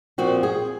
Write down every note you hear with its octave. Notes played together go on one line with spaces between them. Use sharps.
A#2 F3 C4 F#4
G#4